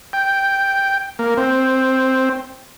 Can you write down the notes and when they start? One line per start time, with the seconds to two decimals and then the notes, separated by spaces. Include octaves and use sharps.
0.13 G5
1.19 A#3
1.37 C4